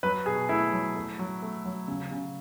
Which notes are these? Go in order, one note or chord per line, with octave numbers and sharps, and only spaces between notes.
F#3 B4
B2 G#4
A3 E4
F#3
A3
F#3
A3
F#3
C#3
C#3